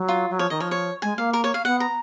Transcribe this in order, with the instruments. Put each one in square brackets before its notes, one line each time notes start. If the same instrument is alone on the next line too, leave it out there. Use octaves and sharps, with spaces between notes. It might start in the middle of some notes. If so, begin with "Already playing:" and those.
Already playing: [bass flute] F#3
[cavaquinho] F4
[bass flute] F#3
[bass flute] F3 [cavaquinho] C#5
[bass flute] D#3 [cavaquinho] D#5
[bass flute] F3 [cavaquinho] C#5
[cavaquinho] C#5
[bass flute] G#3 [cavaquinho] G#5
[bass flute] A#3 [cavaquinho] F5
[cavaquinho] A#4
C#5
F5
[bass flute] B3 [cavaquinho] F#5
[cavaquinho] A#5